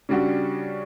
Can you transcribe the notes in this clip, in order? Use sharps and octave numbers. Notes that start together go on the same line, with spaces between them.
C#3 G3 D4 F#4